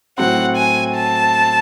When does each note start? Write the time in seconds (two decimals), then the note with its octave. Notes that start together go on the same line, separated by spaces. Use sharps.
0.18 A2 F#3 C4 F#5
0.57 G#5
0.96 A5